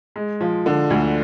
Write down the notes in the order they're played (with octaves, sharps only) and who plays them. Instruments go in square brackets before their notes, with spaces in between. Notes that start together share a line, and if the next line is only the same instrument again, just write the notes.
[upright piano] G#3
F3
D3
D2